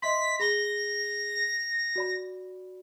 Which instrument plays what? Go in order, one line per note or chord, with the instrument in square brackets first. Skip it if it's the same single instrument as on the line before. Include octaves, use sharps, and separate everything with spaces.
[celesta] D#5 E5 C6 [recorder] B6
[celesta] G#4 B5 G7 [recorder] A#6
[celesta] F#4 D5 B5